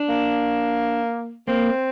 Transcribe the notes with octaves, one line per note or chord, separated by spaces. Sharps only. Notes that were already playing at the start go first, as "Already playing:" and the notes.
Already playing: D4
A#3
A#3 C4